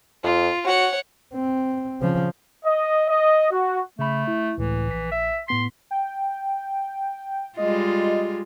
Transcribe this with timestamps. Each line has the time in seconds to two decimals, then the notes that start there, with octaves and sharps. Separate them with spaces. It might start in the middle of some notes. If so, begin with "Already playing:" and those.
0.24 F2 F4
0.66 F#4 C#5 F#5
1.34 C4
2.00 C#3 F3
2.64 D#5
3.08 D#5
3.51 F#4
3.99 C#3 A3 B5
4.28 E4
4.58 C#2 A2 E3
4.88 A#1 B6
5.11 E5
5.48 A2 B3 C6 B6
5.91 G5
7.57 G3 G#3 F4 D#5